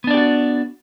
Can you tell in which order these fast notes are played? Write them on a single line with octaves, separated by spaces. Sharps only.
B3 D4 D5 G4 F#4